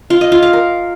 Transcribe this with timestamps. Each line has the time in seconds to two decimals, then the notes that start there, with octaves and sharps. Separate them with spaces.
0.10 F4
0.21 D#5
0.32 F4
0.43 F5
0.53 A#4